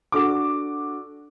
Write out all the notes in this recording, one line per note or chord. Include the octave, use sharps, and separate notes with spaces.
D4 F#4 A4 D6